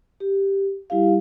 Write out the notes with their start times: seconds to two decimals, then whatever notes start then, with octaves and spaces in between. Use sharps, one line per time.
0.20 G4
0.90 G3 E4 G4 F5